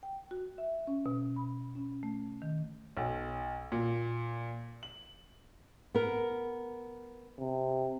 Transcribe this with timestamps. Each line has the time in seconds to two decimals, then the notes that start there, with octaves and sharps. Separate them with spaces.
0.03 G5
0.31 F#4
0.58 E5
0.87 C#4
1.06 B2
1.36 B5
1.75 C#4
2.03 A3
2.42 D#3
2.97 B1
3.72 A#2
4.83 F#7
5.94 B3 A#4
7.39 C3